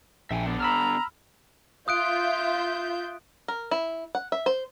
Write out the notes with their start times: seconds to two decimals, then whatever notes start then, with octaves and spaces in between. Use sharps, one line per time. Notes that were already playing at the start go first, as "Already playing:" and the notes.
0.31 A#1 E5 G5 G#5
0.46 D3 B3 D4
0.60 A#5 B5 E6 F6
1.88 F4 E5 D#6 F#6 G6 D7
3.48 A#4
3.71 E4
4.15 F#5
4.32 E5
4.46 C5